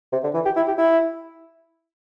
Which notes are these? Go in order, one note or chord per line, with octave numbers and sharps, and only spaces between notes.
C3
D3
E3
G4
E4
G4
E4